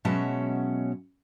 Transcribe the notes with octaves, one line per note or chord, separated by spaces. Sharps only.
B2 F#3 G#3 C#4 E5 A5